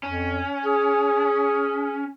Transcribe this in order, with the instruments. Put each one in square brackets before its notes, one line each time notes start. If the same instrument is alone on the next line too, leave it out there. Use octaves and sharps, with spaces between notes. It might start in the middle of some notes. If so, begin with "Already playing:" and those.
[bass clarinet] F2 [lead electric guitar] C#4
[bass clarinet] G#4